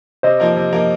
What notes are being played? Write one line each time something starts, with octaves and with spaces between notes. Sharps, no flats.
C3 C5 D#5
F3 A#3 D#4 A#4
C3
F3 A#3 D#4 A#4